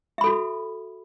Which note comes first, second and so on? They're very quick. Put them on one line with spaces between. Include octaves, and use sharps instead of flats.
E5 B5 A4 F#4